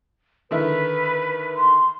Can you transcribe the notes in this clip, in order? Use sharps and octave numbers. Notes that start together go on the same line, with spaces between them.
D3 D#3 E4 B4
C6